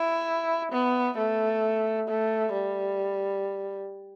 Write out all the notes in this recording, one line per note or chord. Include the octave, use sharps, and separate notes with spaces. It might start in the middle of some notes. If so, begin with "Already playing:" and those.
Already playing: E4
B3
A3
A3
G3